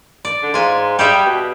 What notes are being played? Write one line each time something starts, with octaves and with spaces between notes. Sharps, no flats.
D5
D3
G#2 F4 G#5
G3 G4 G#4 E5
B2